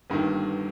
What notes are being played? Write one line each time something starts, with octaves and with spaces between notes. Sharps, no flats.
G1 G2 D#3